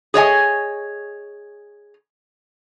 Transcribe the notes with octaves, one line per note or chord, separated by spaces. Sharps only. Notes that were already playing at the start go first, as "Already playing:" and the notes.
G#4 C#5 D#5 G#5